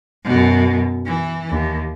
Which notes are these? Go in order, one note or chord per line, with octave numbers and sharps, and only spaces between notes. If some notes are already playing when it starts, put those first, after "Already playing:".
F#2 B2
E3
D#2